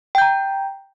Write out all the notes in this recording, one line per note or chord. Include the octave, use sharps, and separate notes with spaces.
G5 A#5 G6